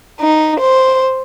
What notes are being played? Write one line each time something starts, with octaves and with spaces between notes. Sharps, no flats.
D#4
C5